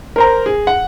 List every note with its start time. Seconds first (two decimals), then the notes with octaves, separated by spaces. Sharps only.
0.16 A#4 C5 A#5
0.46 G#4
0.67 F#5